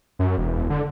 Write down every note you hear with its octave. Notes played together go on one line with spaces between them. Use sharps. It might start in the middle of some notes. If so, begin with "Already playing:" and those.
F#2
E1
D3